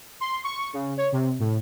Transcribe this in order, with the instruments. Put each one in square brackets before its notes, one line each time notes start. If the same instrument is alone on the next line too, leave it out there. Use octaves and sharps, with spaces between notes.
[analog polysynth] C6
C#6
C#3
C#5
C3
A2